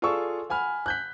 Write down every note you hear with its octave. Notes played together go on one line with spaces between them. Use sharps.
F4 G#4 A4 D5 C#6 E6
F#5 G#5 B5 F6
F#6 G6 B6